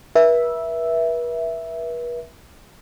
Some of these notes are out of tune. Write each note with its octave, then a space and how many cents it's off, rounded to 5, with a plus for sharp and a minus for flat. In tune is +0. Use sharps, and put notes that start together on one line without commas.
B4 -40 E5 +0